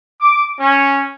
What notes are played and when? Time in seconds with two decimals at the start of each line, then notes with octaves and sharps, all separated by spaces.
0.20 D6
0.59 C#4